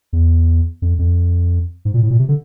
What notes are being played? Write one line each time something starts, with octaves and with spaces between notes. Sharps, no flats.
E2
F2
F2
G#2
A#2
A2
A#2
C3
D3